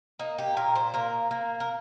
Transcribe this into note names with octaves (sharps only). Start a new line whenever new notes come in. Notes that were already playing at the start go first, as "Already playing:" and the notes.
A#3 D#4
G4
A#2 A#4
C5
A#3 A#4
A#3
A#4